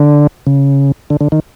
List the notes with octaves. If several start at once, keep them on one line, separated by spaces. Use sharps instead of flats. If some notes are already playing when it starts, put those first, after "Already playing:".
Already playing: D3
C#3
D3
D3
D#3